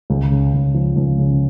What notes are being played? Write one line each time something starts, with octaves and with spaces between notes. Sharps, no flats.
C#2
C#3
C#2
F3
C#2
C#3